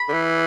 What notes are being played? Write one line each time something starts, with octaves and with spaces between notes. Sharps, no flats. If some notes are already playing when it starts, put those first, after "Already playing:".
Already playing: B5
D3
E3